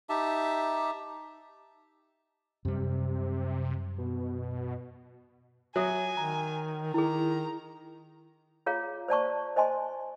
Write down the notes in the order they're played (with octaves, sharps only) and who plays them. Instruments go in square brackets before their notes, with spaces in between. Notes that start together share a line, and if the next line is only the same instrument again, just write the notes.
[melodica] D#4 G4 E5 A5
[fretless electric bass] F#2 G3 [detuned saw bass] C3
[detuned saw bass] B2
[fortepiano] F#3 [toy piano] E5 D#6 [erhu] G#5
[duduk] D#3 [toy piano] A#5
[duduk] D#3 [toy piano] E4 G#4 [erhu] A#5
[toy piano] F4 G#4 C#5 F5 A#5
C5 D5 A5 C#6
C5 D#5 G#5 A5 C6